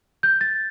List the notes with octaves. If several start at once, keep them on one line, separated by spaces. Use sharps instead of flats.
G6
A6